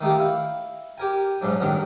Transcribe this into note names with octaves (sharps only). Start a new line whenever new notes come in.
D#3 A3 A#3 G4
E4 F5
G4 A#4 G#5
B1 G#2 F#3 D4
A1 G2 D#3 F#3 D4 A#4